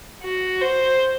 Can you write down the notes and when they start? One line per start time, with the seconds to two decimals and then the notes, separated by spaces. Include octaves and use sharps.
0.23 F#4
0.61 C5